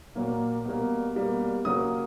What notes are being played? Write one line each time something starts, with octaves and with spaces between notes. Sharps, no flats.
A#2 F#3 A#3
B2 G3 A#3
B2 G3 A#3
C#3 F#3 A#3 D#6